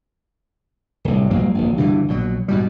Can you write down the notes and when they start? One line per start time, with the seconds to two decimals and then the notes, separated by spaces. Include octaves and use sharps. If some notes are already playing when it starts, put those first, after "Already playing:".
1.05 D1 C2
1.30 A#1 G2 F#3 A#3
1.55 D1 A#1
1.78 G2 B2 D3 E3
2.08 A#1 B2 F#3
2.48 G#2 B2 G3